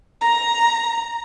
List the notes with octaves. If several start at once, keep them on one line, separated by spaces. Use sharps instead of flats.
A#5